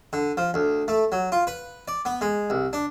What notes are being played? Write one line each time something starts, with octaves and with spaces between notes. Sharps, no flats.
D3
F3
D2
A3
F#3
F4
B4
D5
B3
G#3
C2
D4